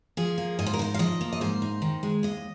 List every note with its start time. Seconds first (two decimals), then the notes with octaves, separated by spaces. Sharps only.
0.17 F3 G#4
0.38 A#3
0.59 G#2 D#5
0.66 C5
0.74 A#4
0.79 D#4 C5
0.94 F5
0.99 F3 D#5
1.21 A#3
1.33 D#5
1.41 G#2 C5
1.62 D#4
1.82 D#3
2.03 G#3
2.23 D#2 D#5